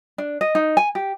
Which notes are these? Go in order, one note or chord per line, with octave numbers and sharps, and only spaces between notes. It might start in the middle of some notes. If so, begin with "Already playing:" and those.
D4
D#5
D#4
G#5
G4